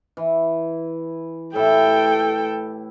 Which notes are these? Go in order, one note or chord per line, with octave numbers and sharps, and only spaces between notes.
E3
A2 E4 G4 A4 G5